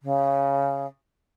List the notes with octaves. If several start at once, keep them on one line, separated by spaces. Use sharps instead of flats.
C#3